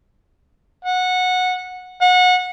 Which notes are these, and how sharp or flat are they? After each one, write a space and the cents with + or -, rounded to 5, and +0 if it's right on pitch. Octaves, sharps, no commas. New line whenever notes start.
F#5 -15
F#5 -25